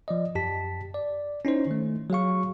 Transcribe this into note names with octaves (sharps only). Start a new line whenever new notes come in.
F3 D5 D#5
F#2 G4 A5 B6
D5
C#4 D#4 E4 C5
D#3 A3
F#3 G#4 F5 C#6